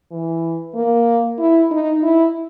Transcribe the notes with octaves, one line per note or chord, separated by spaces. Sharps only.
E3
A#3
E4
D#4
E4